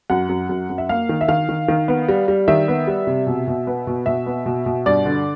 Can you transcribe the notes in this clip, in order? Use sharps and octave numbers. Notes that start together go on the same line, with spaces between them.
F#2 F#5
F#2
F#2
F#2
E5
A#3 F5
D#3
E5
D#3 F5
D#3
D#3
B3
G3
G3
D#3 E5
B3
G3
C3
B2
B2
B3
B2
B2 E5
B3
B2
B2
G2 D5
D3